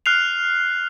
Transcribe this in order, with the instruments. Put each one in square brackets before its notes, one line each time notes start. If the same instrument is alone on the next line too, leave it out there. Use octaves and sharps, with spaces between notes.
[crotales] F6 F#6 C7 F7